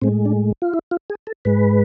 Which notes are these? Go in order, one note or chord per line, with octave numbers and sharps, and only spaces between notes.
A2 G#3 C4
D4
F4
E4
F4
G#4
A4
G#2 G#3 B4